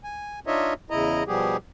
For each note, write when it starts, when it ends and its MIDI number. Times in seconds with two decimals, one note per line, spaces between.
0.04 0.40 80
0.47 0.74 62
0.47 0.74 63
0.47 0.74 65
0.47 0.74 73
0.47 0.74 75
0.47 0.74 76
0.90 1.23 40
0.90 1.23 49
0.90 1.23 64
0.90 1.23 75
0.90 1.23 82
1.27 1.57 47
1.27 1.57 53
1.27 1.57 55
1.27 1.57 59
1.27 1.57 67
1.27 1.57 68